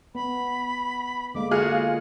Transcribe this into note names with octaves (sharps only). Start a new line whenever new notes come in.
B3 B5
D3 G#3 A#3 D6
F4 F#4 G#4 F6